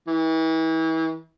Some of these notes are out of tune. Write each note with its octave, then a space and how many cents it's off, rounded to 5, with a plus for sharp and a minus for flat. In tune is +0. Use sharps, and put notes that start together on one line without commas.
E3 -35